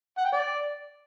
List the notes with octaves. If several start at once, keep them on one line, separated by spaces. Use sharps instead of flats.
F#5
G5
D5